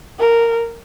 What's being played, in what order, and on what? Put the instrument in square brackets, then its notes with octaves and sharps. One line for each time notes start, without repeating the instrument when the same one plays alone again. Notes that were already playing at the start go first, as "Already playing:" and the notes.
[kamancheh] A#4